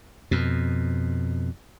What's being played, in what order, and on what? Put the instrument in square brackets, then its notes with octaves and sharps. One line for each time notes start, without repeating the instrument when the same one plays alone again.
[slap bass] F2 B2